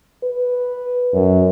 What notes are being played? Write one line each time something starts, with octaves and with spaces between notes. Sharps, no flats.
B4
F#2